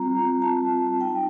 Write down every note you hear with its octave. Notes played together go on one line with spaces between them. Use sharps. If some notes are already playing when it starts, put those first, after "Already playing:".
Already playing: G3 C4 F4 A#5
A5
G3 C4 D#4 G5